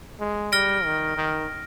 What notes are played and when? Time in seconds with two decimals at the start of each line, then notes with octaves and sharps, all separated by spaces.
0.20 G#3
0.52 G3 F6 A#6 D7 G7
0.85 D#3
1.17 D#3